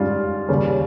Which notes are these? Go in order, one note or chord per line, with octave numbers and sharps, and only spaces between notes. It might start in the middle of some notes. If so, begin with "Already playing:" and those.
Already playing: G#2 G3 C#4 F4
D#2 C#3 G3 C#4